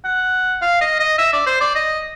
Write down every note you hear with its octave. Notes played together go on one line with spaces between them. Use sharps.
F#5
F5
D#5
D#5
E5
D5
C5
D5
D#5